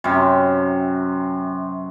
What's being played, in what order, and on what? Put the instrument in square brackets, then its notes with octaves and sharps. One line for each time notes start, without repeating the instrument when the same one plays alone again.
[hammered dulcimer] F#2 C3